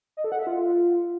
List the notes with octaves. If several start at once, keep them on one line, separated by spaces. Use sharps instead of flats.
D#5
A4
F#5
E5
F4